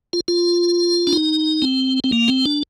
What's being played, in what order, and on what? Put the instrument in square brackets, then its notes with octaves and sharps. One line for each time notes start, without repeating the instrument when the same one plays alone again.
[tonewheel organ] F4
F4
D4
D#4
C4
C4
A#3
C4
D4